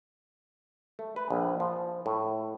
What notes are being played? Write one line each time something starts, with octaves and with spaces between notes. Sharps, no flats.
A3
B4
A#1
F3
A2